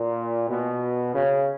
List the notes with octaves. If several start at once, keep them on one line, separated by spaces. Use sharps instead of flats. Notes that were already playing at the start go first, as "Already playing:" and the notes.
Already playing: A#2
B2
C#3